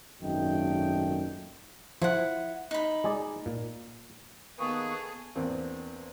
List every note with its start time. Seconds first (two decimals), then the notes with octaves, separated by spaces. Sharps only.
0.21 G#1 F#2 A#2 A3 D#4 G5
2.02 F3 E4 C5 F#5
2.71 D#4 B5
3.04 G#3 G#4 D5
3.46 A#2
4.58 D#3 A#3 B3 G#4 A4 B4 C#6 D#6
5.35 E2 A#3 C4 D4